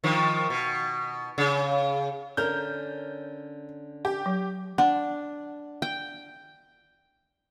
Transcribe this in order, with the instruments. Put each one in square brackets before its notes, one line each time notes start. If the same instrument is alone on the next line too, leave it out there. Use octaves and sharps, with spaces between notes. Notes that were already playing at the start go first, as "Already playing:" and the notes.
[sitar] D#3 F3
B2
C#3
[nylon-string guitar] D3 C#4 A#4 [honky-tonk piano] G6
[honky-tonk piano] G4
[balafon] F#3
[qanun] D4 [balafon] F#5
[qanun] G5